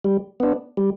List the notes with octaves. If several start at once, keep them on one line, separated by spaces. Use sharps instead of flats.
G3
B3 D4
G3